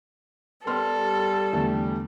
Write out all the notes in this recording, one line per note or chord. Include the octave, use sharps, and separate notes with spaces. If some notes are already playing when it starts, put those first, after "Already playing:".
G3 B3 A4 C6 F6
E2 D3 A3